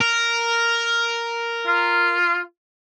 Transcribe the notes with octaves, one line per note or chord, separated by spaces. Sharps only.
A#4
F4